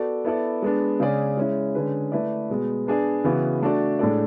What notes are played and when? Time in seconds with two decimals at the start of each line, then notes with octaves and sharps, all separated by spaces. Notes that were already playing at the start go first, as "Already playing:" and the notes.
Already playing: B3 F#4 A4 D5
0.25 B3 E4 A4 D5
0.62 G#3 B3 D4
1.00 C#3 G#3 C#4 G#4 D5
1.37 G#3 C#4 E4
1.75 D3 G#3 C#4 G#4 B4
2.12 A3 E4 B4 D5
2.50 B2 G#3 B3
2.87 B3 D4 G#4 D5
3.24 C#3 E3 B3 F#4
3.62 A3 D4 F#4 A4 D5
3.99 A2 G#3 D4 A4 D5